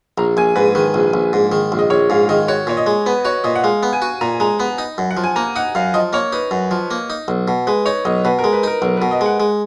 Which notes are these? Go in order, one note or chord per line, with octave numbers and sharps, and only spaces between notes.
A#1 A#5
A#1 G#5
G#2 B4
D#3 B4
A#1
A#1
G#2
D#3
A#1
D#5
A#1 C#5
G#2 F5
D#3 D#5
F#4 C#5
A#2 C#5
D#5
G#3
B3 B4
F#4 C#5
A#2 D#5
F#5
G#3 F5
B3
G#5
F#4
A#2 A#5
G#3 A#5
B3 B5
D#4
F#2
F#5
F3
G#5
A#3 A#5
D#4 F#5
F#2 F5
F3 D#5
A#3 C#5
D#4 B4
F#2
F3
A#3
D#4
B1
B2
G#3 B4
D#4 C#5
B1 D#5
B2 B4
A#4
G#3
B4
D#4 A#4
B1 A#4
B4
B2
D#5
G#3 F#5
G#3